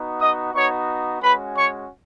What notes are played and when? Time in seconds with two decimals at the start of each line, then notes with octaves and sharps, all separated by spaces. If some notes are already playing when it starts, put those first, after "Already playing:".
Already playing: B3 D#4 F#4
0.19 D#5 D#6
0.53 B3 D#4 F#4 C#5 C#6
1.21 G#3 C#4 F#4 B4 B5
1.56 C#5 C#6